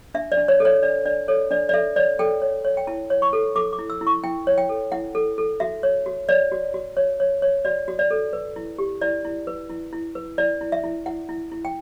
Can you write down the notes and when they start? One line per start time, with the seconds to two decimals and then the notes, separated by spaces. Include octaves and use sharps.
0.14 D4 E5
0.32 D5
0.37 D4
0.48 C#5
0.60 A4
0.65 C#5
0.83 D4 D5
1.05 D4 D5
1.28 A4 C#5
1.51 D4 D5
1.69 D5
1.74 A4 E5
1.96 C#5 D5
2.19 A4 G5
2.42 C#5
2.65 C#5
2.77 G5
2.87 E4 A5
3.10 C#5
3.22 C#6
3.33 A4
3.56 A4 D6
3.73 D6
3.79 E4
3.90 E6
4.01 E4
4.07 C#6
4.24 E4 G5
4.47 C#5
4.58 G5
4.69 A4
4.92 E4 F#5
5.15 A4
5.38 A4
5.60 F#4 E5
5.83 C#5
6.06 F#4
6.29 C#5 D5
6.52 F#4
6.74 F#4
6.97 C#5
7.20 C#5
7.42 C#5
7.65 F#4 D5
7.88 F#4
7.99 D5
8.11 A4
8.33 B4
8.56 E4
8.78 G4
9.01 E4 D5
9.25 E4
9.47 B4
9.70 E4
9.93 E4
10.15 B4
10.38 E4 D5
10.61 E4
10.72 E5
10.84 E4
11.06 E4 F#5
11.29 E4
11.52 E4
11.65 G5